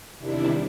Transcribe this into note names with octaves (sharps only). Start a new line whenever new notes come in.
E2 C3 D#3 G3 D4 E4